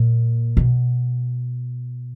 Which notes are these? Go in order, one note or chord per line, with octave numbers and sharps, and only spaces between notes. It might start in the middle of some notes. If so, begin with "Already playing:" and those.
Already playing: A#2
B2